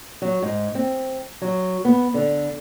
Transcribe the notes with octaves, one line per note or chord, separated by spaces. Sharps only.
F#3
G#2
C4
F#3
B3
D3